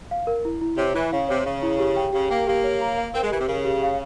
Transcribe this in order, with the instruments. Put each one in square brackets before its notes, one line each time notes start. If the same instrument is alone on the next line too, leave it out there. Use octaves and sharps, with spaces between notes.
[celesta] F5
A#4
E4
E4
[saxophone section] C3 [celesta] C#5
[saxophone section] E3 [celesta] E4
[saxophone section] C#3 [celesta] F5
[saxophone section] C3 [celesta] C#5
[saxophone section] C#3 [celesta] C#5
[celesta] E4
G4
G5
[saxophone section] C#3 [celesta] G4
[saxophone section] A#3 [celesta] G5
[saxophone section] A#3 [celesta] G4
[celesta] C#5
A#5
F5
[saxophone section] C4 [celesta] A#4
[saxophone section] G#3
[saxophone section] E3 [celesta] G4
[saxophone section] C3
[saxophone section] C#3 [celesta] A#4
[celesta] G4
F5